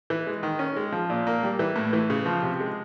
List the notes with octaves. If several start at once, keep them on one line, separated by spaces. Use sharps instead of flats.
E3
G#3
D#3
C#4
G#3
F3
A#2
A#3
G3
E3
A2
E3
C#3
F3
C3
G#3